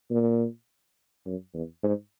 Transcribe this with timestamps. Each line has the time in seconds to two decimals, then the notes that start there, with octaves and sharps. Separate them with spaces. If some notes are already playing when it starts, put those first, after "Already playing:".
0.11 A#2
1.26 F#2
1.54 E2
1.83 G#2